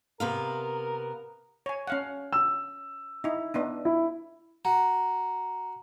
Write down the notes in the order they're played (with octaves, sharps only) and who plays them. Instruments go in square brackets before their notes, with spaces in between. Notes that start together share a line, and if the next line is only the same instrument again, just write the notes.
[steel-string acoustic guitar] C3 B3 F5 [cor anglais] A#4
[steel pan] C#5 G#5
C#4 F5 F#5
[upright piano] E6
[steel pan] D#4 E4
B3 D4 D#4
[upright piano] E4
[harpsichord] F#4 [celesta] A#5